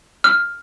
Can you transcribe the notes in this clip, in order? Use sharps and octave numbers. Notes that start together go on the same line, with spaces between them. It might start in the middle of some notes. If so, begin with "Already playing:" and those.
F6